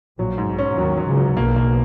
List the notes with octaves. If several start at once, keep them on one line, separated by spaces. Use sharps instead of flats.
A#1 A#2 F#3
G#2
B1 B2
C#4
D#2 D#3 F#3
F#3
C#2 C#3
F#3
B1 B2 A#3
A#3